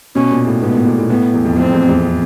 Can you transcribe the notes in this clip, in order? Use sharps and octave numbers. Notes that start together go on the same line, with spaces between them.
B2 C#4
A#2
A2
G#2 B3
A2
A#2
A2
A2 B3
E2
F2
F2 C4
E2
E2